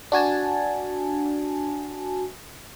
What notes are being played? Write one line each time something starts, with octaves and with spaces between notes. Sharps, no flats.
D4 F#4 G#5 A5